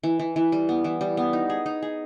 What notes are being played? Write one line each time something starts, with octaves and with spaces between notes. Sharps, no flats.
E3
E3
E3
G3
B3
E3
G3
B3
D#4
G#4
D#4
G#4